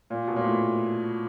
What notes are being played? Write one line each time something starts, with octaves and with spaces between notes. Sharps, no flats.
A#2
B2
A#2
A2